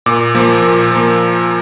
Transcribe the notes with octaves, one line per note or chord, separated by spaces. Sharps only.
A#2 D6
F3 A#3
A#2
F3 A#3